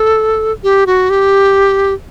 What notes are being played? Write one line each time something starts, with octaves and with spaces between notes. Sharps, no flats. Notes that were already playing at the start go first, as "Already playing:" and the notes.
Already playing: A4
G4
F#4
G4